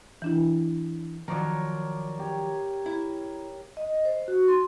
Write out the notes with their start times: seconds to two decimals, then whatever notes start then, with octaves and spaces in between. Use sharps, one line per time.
0.22 E3 D4 E4
1.28 D#3 F3 F#3 A#4 C#5 D5
2.19 G4 C#5
2.86 E4
3.77 D#5
4.05 C5
4.28 F#4
4.48 C6